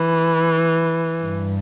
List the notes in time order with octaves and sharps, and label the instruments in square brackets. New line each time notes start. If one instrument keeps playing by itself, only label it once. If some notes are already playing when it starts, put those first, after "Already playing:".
Already playing: [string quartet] E3
G2